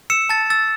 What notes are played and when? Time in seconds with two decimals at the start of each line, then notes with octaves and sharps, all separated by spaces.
0.10 E6 C#7 E7
0.29 A5 A6
0.50 E6 A6